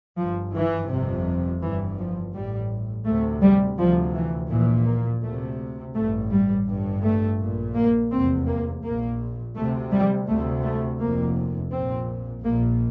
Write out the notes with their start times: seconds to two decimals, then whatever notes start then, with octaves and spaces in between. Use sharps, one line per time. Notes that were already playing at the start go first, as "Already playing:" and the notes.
0.17 G1 G2 F3
0.54 E3
0.90 G1 F2 C3
1.62 G1 G2 E3
1.98 F3
2.34 A1 A2 G3
3.06 D2 C3 A3
3.42 G3
3.78 D2 C3 F3
4.14 E3
4.50 A#1 A#2 E3
4.87 A#3
5.23 D2 C3 A3
5.95 A1 G2 A3
6.31 G3
6.67 G1 G2
7.03 A3
7.39 A#1 A#2
7.75 A#3
8.11 F1 E2 C3 C4
8.47 A#3
8.83 A#1 A#2 A#3
9.55 D2 C3 A3
9.92 G3
10.28 D2 C3 A3
10.64 A3
10.99 F1 F2 C3 A#3
11.72 A#1 A#2 C4
12.44 A#1 A#2 A#3